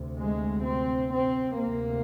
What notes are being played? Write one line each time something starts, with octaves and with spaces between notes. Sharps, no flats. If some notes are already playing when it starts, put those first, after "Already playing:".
Already playing: D2 C3
G#3
C4
C4
D2 C3 A#3